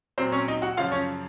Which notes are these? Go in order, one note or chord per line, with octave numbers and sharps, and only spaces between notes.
A#2 F#3 C4 C5
C#4 C#5
D#4 D#5
F#4 F#5
F#2 C#3 F3 F4 F5
C#4 C#5